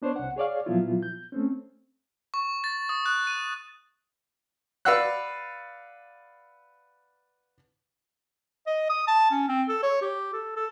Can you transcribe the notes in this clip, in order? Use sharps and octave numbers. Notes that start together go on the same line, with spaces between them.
B3 D4 C5 C#5
C2 F#5
G#4 C#5 D5 F5
A#2 F3 F#3 B3 E4 F4
G6
A3 C4 C#4
C#6
A6
D#6
F#6
D#7
B4 D5 F5 F#5 E6 F#6
D#5
D#6
A5
C#4
C4
A4
C#5
G4
A4
A4